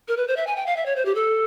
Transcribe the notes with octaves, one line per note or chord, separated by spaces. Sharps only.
A#4
B4
C5
E5
G#5
G5
F5
E5
C#5
C5
G4
A4